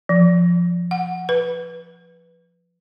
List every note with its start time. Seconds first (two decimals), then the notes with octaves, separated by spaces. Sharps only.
0.09 F3
0.91 F#5
1.29 B4